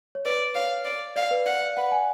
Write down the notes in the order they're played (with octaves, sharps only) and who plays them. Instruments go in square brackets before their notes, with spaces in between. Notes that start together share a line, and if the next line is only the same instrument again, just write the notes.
[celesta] C#5
[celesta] B4 [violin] D5
[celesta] C#5 [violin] F5
[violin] D5
[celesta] D5 [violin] F5
[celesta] B4
[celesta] D5 [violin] F#5
[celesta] F5
[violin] B4 [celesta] F#5
[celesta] G#5